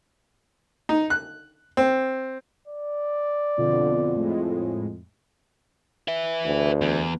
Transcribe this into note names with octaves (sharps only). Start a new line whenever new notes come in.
D#4
F#6
C4
D5
F2 B2 D3
A2 G#3
B4 E5
D2
E2